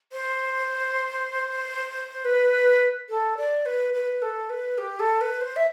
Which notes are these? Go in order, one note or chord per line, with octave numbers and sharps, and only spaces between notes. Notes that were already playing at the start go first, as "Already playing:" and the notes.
C5
B4
A4
D5
B4
B4
A4
B4
G4
A4
B4
C5
E5